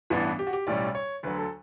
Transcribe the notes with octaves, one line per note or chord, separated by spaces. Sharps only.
A1 G2 E3 B3 D4
G4
F#4
G4
B1 A2 G3 C#4 D5
C#5
D2 D3 F#3 B4
A4